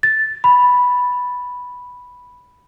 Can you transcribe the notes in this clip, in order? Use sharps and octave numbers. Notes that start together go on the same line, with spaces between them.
A6
B5